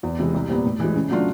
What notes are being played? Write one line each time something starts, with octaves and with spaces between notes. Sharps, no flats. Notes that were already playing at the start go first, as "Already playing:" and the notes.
E2
C3 E3 G#3
C2
A#2 G3 B3
A2
E3 G#3
C#3
F#3 A3 D4 F4